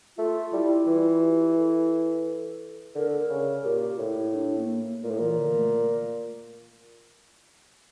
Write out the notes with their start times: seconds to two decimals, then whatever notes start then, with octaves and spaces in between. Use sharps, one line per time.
0.18 A3 F4
0.53 G3 E4
0.87 E3 F4
1.22 G4
1.57 A4
2.95 D3 A#4
3.07 A4
3.19 A#4
3.30 C#3
3.64 A#2 G4
3.99 A2 E4
4.35 D4
4.58 A#3
4.80 A#3
5.03 A#2 A3
5.11 A2
5.19 A#2 E3
5.39 D3
5.56 A3